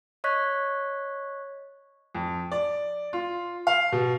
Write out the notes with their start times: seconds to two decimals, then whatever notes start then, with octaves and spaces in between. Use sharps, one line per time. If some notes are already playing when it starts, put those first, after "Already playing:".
0.24 C#5 D#5 C#6 F#6 G#6 B6
2.15 F2
2.52 D5
3.13 F4
3.67 F5
3.92 B2